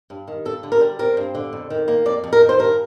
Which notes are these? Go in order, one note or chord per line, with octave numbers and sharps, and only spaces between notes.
G2
D#3
G2 A4
D3
A#4
G3
C4 A#4
G2
D3
F2
D#3
A#3
F2 D5
F2
A#4
D#3
C5
G2 A#4